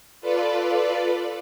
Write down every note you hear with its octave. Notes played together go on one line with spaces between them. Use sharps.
F4 A4 B4 D5